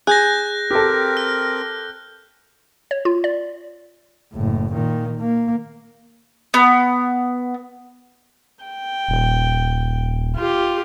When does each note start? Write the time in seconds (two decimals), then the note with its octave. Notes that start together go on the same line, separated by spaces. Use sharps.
0.07 G#4 F#6 G6 A#6
0.71 C4 G4 A4 A#4
1.17 F6
2.91 C#5
3.05 F4
3.24 D5
4.34 F#1 A2
4.72 A#2 D#3
5.20 A#3
6.54 B3
8.64 G5
9.09 D#1
10.36 F4 G4